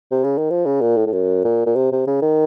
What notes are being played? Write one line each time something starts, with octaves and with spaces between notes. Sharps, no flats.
C3
C#3
D#3
F3
C#3
A#2
A2
A2
F#2
A#2
A#2
C3
C3
C#3
D#3